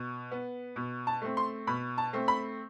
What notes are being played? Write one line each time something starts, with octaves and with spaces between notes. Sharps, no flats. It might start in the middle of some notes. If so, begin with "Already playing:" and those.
Already playing: B2
B3
B2
A5
A3 C4
C6
B2 B5
A5
A3 C4
B5